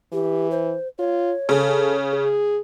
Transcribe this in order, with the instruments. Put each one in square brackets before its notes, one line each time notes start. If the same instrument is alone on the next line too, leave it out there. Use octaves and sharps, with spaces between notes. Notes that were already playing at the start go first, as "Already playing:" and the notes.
[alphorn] E3 [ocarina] G4
[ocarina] C5
[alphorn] F4 [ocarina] C#5
[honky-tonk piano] C#3 [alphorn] A4
[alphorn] G#4